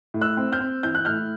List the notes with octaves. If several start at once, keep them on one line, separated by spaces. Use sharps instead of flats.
A2
E6 F#6
C4
F6 G6
C4
E3 G6
F#6
A2 F6 G6